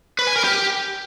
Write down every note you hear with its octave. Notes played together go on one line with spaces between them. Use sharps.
B4
G#5
A#4
G4